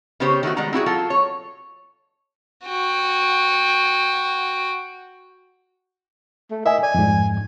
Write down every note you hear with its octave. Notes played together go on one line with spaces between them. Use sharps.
C#3 B3 G4 C5 C#5
D#3 A3 D4 F#4
D#3 G3 G#3 F#5 A#5
C4 E4 F#4 G#4
F#3 F4 A4
C#5
F#4 G5
A3
A#4 D#5 E5 G#5
D5 G#5
F2 G#2